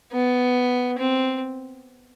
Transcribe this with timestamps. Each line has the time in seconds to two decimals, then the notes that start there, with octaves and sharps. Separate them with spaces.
0.12 B3
0.99 C4